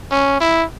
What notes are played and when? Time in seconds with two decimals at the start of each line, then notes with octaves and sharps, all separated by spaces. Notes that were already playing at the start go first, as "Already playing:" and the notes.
0.12 C#4
0.41 E4